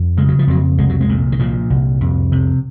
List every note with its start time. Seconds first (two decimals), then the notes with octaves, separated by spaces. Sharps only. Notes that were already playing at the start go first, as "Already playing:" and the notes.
Already playing: F2
0.17 C#3 G#3
0.29 F#3
0.39 F3
0.48 F2 F#3
0.78 C2 G#3
0.89 F#3
1.01 G#3
1.09 A#2
1.32 D#3
1.39 A#2 F3
1.70 C2
2.01 F2
2.32 C3